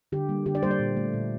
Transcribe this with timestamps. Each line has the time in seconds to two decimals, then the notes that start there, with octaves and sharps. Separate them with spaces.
0.12 D3 G4
0.29 G3 A#3
0.46 D3 G4
0.55 D5
0.63 G3 A#3 C5
0.71 D5
0.80 A#2
0.97 A3
1.14 A#2